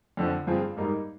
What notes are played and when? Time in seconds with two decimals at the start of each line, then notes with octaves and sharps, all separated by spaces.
0.17 F2 D3 F3 C4
0.47 G2 F3 C4 F4 G#4
0.77 G#2 G3 A#3 D#4